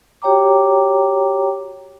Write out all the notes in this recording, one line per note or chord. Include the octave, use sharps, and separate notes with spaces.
F#4 G4 C#5 G5 A#5 D6